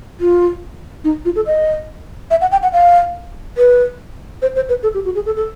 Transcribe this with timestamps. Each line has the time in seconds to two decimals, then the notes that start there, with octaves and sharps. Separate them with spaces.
0.21 F4
1.04 D#4
1.25 F4
1.36 A4
1.46 D#5
2.31 E5
2.41 F#5
2.52 G5
2.63 F#5
2.73 F5
3.58 B4
4.42 C5
4.56 C5
4.69 B4
4.83 A4
4.94 G4
5.05 F#4
5.15 G#4
5.26 A4
5.36 A4